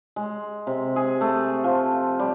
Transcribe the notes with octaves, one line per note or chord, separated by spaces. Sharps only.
G#3
C3
G#4
A3
F3
G3